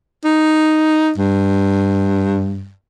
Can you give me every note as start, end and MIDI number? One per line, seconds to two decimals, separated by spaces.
0.24 1.11 63
1.18 2.71 43